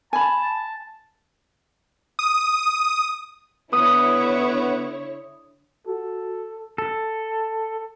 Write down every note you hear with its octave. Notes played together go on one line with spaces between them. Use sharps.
G#5 A5 B5
D#6
D3 B3 E4 C#5 D#6
F#4 A4
A4